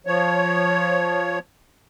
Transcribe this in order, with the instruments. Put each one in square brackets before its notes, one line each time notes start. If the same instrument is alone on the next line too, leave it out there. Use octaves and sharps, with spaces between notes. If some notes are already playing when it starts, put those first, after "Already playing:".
[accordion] F3 C#5